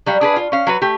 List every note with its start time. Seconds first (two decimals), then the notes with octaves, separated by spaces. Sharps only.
0.06 F#3 G3 F5
0.21 D4 G#4 B4
0.36 F4
0.52 C#4 F5
0.67 F#3 F#4 B4
0.82 A3 G4